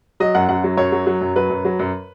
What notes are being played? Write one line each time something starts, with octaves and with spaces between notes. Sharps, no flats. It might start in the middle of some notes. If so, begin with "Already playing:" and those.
F#3 D#5
F#2 F#5
F#2 F#5
F#3
F#2 C#5
F#3
F#3
F#2
F#3 B4
F#2
F#3
F#2